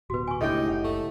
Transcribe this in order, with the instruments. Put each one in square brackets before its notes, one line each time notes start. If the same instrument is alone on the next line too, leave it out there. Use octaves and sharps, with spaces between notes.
[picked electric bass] D1 B2 [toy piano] F#4 B4
[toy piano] G#5 C#6
[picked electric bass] C#2 D4 [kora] A2 G4 G5 [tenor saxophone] D#4 [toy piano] D#5 E5
[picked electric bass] F#1 [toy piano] F#5
[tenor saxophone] A3